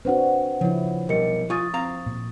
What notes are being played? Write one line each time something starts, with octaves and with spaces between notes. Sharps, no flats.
C4 D4 F#4 B4 C5 F#5
C#3 F3 E4
B1 G3 A#4 D#5 C#7
F4 G#5 C#6 D#6 A6
C4 F5 A#5
A#2